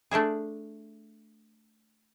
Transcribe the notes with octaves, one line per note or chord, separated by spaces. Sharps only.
A3 D4 E4 G#4